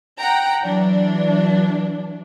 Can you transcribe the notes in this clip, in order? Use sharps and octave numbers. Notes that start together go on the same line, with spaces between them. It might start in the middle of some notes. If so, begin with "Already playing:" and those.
F#5 G5 A#5
E3 F#3 D4